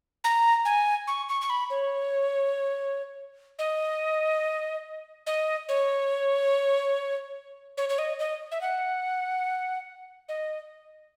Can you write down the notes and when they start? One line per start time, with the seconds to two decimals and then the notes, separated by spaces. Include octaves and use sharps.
0.24 A#5
0.65 G#5
1.07 C#6
1.29 C#6
1.41 C#6
1.50 B5
1.70 C#5
3.59 D#5
5.27 D#5
5.69 C#5
7.77 C#5
7.89 C#5
7.98 D#5
8.19 D#5
8.51 E5
8.61 F#5
10.29 D#5